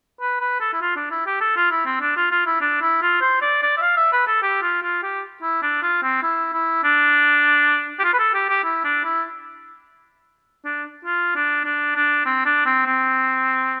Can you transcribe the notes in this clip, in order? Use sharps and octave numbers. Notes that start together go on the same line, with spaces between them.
B4
B4
A4
E4
F4
D4
E4
G4
A4
F4
E4
C4
D4
F4
F4
E4
D4
E4
F4
C5
D5
D5
E5
F5
E5
B4
A4
G4
F4
F4
G4
E4
D4
F4
C4
E4
E4
D4
G4
F4
B4
A4
G4
G4
E4
D4
E4
D4
F4
D4
D4
D4
C4
D4
C4
C4